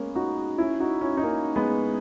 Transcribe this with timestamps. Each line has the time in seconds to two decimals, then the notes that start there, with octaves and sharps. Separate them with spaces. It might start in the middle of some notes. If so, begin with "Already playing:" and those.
Already playing: G#3 A#3 B3 C#4
0.15 D#4 F#4
0.58 C#4 E4
0.80 D#4 F#4
1.01 C#4 E4
1.17 D#4
1.23 A#3 C#4
1.56 G#3 B3